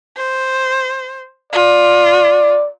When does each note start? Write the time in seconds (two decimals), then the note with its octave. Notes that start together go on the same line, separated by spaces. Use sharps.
0.17 C5
1.53 F4 D5